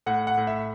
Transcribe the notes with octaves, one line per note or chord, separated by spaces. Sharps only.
A2 F#5
F#5
A2
E5